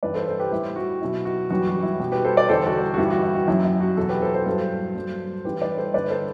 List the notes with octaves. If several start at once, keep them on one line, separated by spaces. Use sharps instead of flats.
G2 E3 G3 B4 D5
A4 C5
A4 C5
G4 B4
A2 G3 E4 G4
F#4
B2 F#3 E4
F#4
F#2 E3 G3 F#4
F#4
E4
B2 G3
G4 B4
A4 C5
B4 D5
E2 D3 G3 A4 C5
F#4 A4
F#4
G2 E3 G3 E4 G4
F#4
E4
F#4
F#2 F#3 E4
E4
F#4
E2 B2 F#3 F#4 A4
G4 B4
A4 C5
A4 C5
G2 F#3
G2 F#3
A2 E3 G3 G4 B4
B4 D5
A4 C5
G2 D3 G3 B4 D5
A4 C5